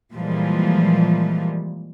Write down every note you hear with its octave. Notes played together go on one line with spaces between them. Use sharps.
A#2 E3 F3 G3 G#3